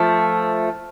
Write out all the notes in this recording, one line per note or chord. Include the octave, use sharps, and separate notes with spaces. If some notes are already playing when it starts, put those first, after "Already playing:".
Already playing: F3 A3